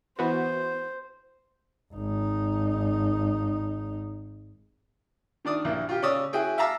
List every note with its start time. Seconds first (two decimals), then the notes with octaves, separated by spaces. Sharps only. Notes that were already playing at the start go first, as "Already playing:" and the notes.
0.19 E3 B3 F#4 C5
1.94 G#1 D#4
5.45 D#3 D4 D5 D#6
5.65 A#1 A#3 E4
5.89 F4 G4
6.02 C#3 C#4 C#5 D5 D#6 E6
6.33 E4 F#4 G#4 G5
6.58 E5 F5 A5 A#5 D6 E6